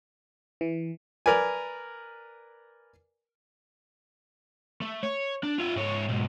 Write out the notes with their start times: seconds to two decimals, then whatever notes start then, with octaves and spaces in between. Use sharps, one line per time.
0.61 E3
1.26 A#4 B4 D5 G#5
4.82 A3
5.03 C#5
5.44 D4
5.59 F4 E5
5.76 G#2 C#5
6.09 G#2 B2